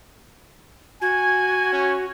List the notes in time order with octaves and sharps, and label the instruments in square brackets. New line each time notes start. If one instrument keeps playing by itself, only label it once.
[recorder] F#4 [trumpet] G#5 [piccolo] G#6
[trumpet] C#4